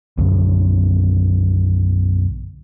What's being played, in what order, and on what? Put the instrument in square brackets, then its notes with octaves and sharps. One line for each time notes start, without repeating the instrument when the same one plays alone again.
[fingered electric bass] B1 F#2 D3